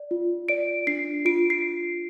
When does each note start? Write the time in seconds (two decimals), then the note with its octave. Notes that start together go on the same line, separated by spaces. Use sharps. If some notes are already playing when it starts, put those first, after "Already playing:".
Already playing: D5
0.11 F4
0.49 D5 D7
0.87 D4 C7
1.25 F4 D7
1.50 C7